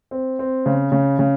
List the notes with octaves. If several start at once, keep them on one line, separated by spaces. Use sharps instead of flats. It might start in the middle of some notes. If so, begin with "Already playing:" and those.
C4
C4
C#3
C#3
C#3